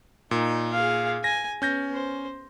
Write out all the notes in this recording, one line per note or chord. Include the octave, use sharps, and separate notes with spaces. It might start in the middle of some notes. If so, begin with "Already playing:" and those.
A#2 D#4
G#4 F5
G#5 A#6
B3 C#4 G6 A#6
C5